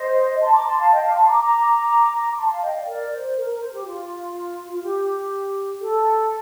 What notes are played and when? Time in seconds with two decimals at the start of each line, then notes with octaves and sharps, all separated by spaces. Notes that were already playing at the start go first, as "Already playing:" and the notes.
Already playing: C5 D#5
0.42 A5 C6
0.54 A#5 D6
0.67 A5 C6
0.79 F5 A5
0.92 D#5 G5
1.04 F5 A5
1.10 D6
1.15 A5 C6
1.28 A#5 D6
1.40 A#5 D6
2.31 D6
2.38 A5 C6
2.50 F5 A5
2.62 D#5 G5
2.75 D5 F5
2.87 A#4 D5
3.12 C5
3.36 A#4
3.49 A#4
3.60 C5
3.73 G4
3.85 F4
4.71 F4
4.82 G4
5.80 A4